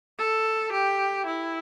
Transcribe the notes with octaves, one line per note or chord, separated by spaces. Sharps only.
A4
G4
E4